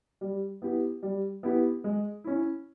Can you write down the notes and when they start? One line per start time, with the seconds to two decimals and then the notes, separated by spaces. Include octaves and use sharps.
0.21 G3
0.62 B3 E4 G4
1.03 G3
1.43 B3 E4 G4
1.84 G#3
2.24 C#4 E4